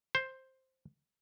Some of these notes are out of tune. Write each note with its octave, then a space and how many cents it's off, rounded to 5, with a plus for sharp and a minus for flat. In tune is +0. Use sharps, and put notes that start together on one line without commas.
C5 +5